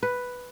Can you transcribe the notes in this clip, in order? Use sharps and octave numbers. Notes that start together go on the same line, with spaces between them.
B4